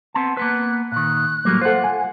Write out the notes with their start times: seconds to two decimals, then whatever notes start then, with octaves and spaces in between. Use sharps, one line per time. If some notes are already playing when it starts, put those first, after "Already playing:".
0.14 B3 C4 A5
0.37 A#3 B3 B4 F#6
0.92 A#2 D#3 F#6
1.45 A2 F#3 G3 A3 A#3
1.62 F4 A4 C5 F#5
1.84 G#5